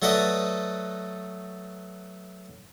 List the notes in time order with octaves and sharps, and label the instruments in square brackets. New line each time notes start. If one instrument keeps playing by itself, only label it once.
[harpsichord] F#3 A3 F#4 B4 D5 D#5